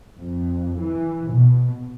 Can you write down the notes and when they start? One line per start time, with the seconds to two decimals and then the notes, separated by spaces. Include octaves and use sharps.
0.17 F2
0.79 E3
1.32 B2